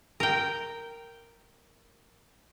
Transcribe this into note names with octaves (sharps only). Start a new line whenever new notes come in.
A#4 G5